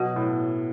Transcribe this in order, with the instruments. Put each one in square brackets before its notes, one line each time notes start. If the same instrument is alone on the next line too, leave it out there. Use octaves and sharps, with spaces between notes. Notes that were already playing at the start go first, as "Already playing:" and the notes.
Already playing: [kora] B2 [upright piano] F#3
[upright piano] A2